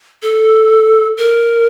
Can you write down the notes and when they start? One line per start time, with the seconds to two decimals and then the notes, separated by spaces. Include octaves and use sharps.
0.22 A4
1.17 A#4